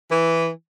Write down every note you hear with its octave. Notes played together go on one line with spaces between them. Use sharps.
E3